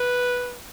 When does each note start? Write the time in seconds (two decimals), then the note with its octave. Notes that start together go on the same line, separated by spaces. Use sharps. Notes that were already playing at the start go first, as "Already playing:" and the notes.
Already playing: B4